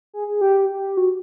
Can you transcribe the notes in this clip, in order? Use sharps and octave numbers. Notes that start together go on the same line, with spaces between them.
G#4
G#4
G4
G4
F#4